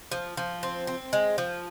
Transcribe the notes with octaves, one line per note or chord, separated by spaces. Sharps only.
F3
F3
C4
C4
G#3
F3